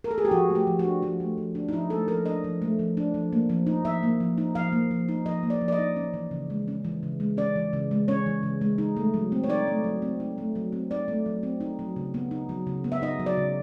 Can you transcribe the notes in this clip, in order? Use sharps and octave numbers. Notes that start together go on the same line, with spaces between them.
A#4
A4
G#4
G4
F3 F#4
A3
G4
F3
F#4
D4
F3 F4
A3
F3
D4
D#4
F3 E4
A3 A4
F3 A#4
D4 D#5
F3
A3
F3
D4
F3
A#3
F3
D#4
F3 E5
A#3
F3
D#4
F3 F5
A#3
F3
D#4
F3 D#5
A#3
D5
F3
D5
D#5
D#4
C#4
E3
C#3
G#3
C#4
E3
C#3
G#3
C#4 D5
E3
C#3
G#3
C#4 C#5
E3
C#3
G#3
D#4
A3
F#3
C4
C#5
D#4 D5
A3
F#3
C4
D#4
A3
F#3
C4
D#4 D5
A3
F#3
C4
D#4
F#3
C#3
B3
D#4
F#3
C#3
B3
E5
D#4 D#5
F#3
D5
C#3